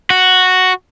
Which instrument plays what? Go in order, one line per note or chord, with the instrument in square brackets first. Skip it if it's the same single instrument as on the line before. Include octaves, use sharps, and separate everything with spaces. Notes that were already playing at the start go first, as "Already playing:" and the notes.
[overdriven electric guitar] F#4